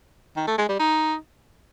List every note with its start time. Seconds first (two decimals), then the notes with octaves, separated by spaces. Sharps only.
0.36 D#3
0.47 A3
0.58 G#3
0.68 G3
0.79 D#4